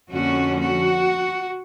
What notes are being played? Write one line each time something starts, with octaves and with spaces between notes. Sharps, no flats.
F2 D3 F3 A#3 C#4 F#4
F#4